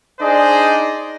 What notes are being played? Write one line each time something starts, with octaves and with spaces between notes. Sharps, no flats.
D4 D#4 G#4 C5 D5 D#5